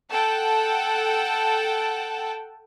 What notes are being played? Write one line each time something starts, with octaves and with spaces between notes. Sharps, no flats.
A4 F#5 G5 A5